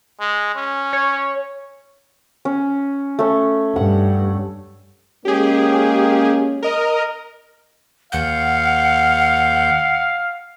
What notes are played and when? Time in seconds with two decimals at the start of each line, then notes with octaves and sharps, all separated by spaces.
0.20 G#3
0.55 C#4
0.93 C#5
2.45 C#4
3.19 A3 C#4
3.76 G2 F#5
5.25 G#3 A#3 C#4 G4 G#4
6.63 A#4 D#5
8.12 D#2 F5 F#5 G6